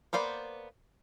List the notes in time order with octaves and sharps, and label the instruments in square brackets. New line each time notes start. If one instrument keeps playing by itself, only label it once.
[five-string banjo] A#3 B3 C5 D5 B5